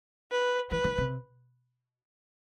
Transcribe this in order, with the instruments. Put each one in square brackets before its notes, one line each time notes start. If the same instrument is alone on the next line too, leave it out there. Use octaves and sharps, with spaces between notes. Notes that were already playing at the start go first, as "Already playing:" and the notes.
[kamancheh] B4
[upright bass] E3 [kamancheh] B4
[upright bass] D#3
C3